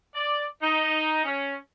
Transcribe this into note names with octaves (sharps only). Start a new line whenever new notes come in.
D5
D#4
C#4